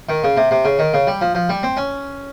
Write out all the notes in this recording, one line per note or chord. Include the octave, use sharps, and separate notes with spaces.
D#3
C#3
C3
C3
C#3
D#3
C#3
G3
F3
F3
G3
C4
C#4